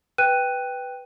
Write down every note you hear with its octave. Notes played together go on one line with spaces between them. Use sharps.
B4 G5 F#6 D#7